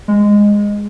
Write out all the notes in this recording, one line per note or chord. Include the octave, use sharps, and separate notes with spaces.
G#3